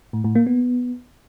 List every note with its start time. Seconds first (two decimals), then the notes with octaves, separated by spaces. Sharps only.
0.13 A2
0.24 A2
0.35 A#3
0.46 B3